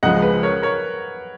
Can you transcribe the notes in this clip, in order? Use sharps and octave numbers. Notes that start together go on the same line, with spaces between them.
C#2 C#3 F3 G#3 D#5 F#5
B4
A#4 C#5
A#4 C#5